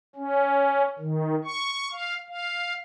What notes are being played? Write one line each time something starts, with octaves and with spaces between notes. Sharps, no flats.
C#4
D#3
C#6
F5
F5